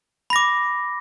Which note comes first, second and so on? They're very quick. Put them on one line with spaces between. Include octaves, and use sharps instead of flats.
B5 A#6 D6